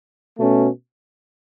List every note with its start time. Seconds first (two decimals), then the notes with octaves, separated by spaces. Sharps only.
0.38 B2 A3 C#4